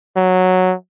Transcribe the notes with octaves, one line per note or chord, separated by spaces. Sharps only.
F#3